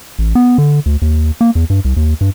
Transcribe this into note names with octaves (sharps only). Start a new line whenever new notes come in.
A1
B3
D3
D2
D#2
A#3
E2
G2
C2
D#2
G2